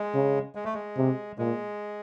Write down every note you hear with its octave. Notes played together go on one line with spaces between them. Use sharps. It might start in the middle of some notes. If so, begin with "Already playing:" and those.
Already playing: G#3
C#3
G#3
A3
G#3
C3
A#2 G#3